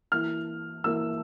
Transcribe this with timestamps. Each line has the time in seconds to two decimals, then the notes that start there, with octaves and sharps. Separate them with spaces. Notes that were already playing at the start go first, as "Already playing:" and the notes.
0.12 E3 A#3 E4 F6
0.84 E3 A#3 E4 E6